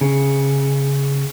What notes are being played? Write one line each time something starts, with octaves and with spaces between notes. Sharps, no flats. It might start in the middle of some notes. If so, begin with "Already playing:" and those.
C#3